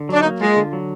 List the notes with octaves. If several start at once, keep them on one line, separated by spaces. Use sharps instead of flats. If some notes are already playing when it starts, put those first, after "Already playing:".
Already playing: D3
F#3 D4
D#4
A#3
G#3 F4
D3
F#3